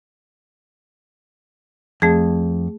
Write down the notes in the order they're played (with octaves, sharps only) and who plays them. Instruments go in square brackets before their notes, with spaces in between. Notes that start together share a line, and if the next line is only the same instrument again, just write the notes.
[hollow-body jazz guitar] F2 [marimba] A3 G#4